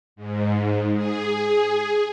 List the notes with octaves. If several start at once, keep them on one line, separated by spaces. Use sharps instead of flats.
G#2
G#4